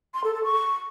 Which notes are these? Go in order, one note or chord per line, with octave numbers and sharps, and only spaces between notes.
C6
A4
A4
C#6